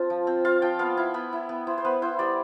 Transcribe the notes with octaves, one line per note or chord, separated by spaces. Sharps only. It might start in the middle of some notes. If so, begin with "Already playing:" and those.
Already playing: C4 F4 A5
F3
C4
F4 F5
F3 G5
B3 F5
E4
B3 B5
E4
B3
E4 C5
C5
B3 B4
E4 C5
G3 D5